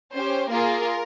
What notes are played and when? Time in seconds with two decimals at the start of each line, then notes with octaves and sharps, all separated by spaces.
0.12 C#4 G4 C5
0.50 A#3 F4 G#4 A#4